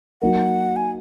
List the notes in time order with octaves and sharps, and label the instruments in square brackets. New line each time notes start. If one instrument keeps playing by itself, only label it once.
[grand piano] F#3 A#3 D#4 A#4 [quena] F#5
[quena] G#5